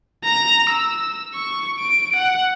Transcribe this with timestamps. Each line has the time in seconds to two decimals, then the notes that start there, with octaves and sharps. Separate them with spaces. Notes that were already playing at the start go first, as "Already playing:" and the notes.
0.25 A#5
0.70 E6
1.34 C#6
1.80 D7
2.16 F#5